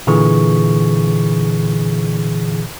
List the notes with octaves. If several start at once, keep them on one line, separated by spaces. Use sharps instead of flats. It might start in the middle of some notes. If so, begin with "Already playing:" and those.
A#2 D3 E3 G#4 C#6